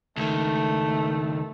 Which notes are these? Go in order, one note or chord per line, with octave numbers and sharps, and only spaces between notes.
C#2 D#3 A3